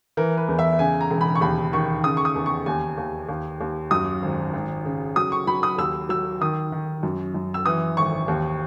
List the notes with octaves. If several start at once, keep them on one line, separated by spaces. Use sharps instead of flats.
E3 A#4
B4
E2
E5
C#3 G#5
A#5
E1
B5
C#6
D#2 B5
D#3 C#6
C#3 D#6
C#6
D#6
E2
C#6
D#2 G#5
D#2
D#2
D#2
F#2 D#6
G#1
G#1
C#3
F#3 D#6
C#6
F#3 B5
D#6
D#2 E6
F#3 E6
D#3 D#6
D#3
F#2
F#2
E6
E3 D#6
G#1 C#6
D#2